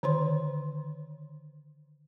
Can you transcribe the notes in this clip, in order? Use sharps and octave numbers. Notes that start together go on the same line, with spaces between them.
D3 D#3 C5 C#5 C6